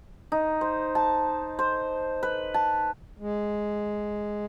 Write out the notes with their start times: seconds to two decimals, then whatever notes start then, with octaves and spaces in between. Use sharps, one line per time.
0.32 D#4
0.61 C5
0.95 A5
1.59 C5
2.23 B4
2.54 A5
3.20 G#3